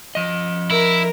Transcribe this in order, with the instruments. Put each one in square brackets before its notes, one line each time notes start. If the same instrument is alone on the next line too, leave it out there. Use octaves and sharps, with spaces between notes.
[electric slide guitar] F3 D#5
[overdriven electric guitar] E4 [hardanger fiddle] A#4